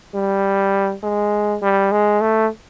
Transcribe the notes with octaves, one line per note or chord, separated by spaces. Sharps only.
G3
G#3
G3
G#3
A3